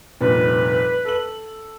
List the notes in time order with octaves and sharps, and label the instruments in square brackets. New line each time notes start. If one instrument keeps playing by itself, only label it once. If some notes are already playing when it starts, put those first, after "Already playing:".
[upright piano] F1 G2 A#2 [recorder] B4
[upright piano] A4 F#7